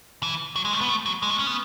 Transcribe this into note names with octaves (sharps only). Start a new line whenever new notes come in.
E3
F#3
G#3
A3
B3
A3
F#3
G#3
A3
C#4
B3